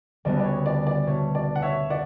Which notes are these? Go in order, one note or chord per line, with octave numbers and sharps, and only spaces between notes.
D2 C#3 G3 B3 D4 D5
D5
C#5
D5
D5
B2 A3 D4 C#5
D5
F#5
C#5 E5
D5 F#5